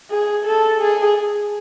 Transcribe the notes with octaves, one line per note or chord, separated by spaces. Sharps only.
G#4
A4
G#4